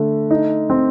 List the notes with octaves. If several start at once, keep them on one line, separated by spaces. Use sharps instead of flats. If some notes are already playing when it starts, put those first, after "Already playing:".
Already playing: D3 A3
D#4
C4